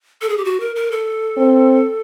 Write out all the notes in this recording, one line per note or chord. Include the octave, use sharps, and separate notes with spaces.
A4
G#4
G4
F#4
A#4
A#4
A4
C4